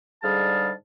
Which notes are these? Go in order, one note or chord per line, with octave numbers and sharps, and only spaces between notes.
G#2 D3 G3 G#4 F5 A5